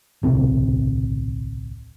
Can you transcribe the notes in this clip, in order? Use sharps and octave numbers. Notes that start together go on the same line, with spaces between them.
D1 B1 C3 C4